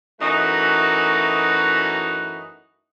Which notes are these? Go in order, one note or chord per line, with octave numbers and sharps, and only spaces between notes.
F#2 E3 A3 D#4 F#4 B4